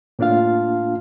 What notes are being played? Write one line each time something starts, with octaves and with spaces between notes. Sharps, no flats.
A2 A#3 D4 F4 F5